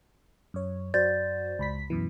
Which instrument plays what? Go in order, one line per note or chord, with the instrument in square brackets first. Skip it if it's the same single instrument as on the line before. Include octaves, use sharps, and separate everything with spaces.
[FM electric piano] F#2 C#5
[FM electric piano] F#2 F#4 C5 [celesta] D5 G6 A6
[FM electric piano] C#2 B5 B6
F#2 B2 E3